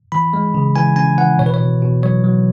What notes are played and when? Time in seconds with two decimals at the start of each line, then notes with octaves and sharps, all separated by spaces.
0.12 E3 B5
0.33 G#3
0.54 C#3
0.76 E3 G#5
0.96 C#4 G#5
1.18 E3 F#5
1.39 B2 C#5
1.46 B4
1.54 C#5
1.60 B2
1.82 B2
2.03 F#3 C#5
2.24 F#3